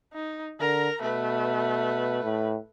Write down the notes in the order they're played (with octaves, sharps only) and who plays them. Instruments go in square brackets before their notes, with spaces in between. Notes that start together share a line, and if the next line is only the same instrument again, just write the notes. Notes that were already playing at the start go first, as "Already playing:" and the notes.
[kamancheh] D#4
[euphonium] D3 [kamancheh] A#4 A#5
[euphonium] B2 [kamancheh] A3 B4
[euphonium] A2